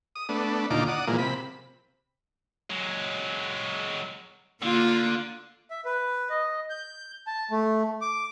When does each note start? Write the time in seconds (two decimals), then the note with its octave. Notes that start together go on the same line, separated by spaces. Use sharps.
0.15 D#6
0.29 A3 B3 D4
0.70 D#2 A#2 D3 D#4 F4 D6
0.88 D5 F#5 D#6
1.07 A#2 E3 F3 G#3 A#3
1.18 C3 B5
2.70 F#3 G#3
4.63 D3 A#3 F4
5.71 E5
5.85 B4
6.30 D#5
6.70 G6
7.27 A5
7.51 A3
8.01 D6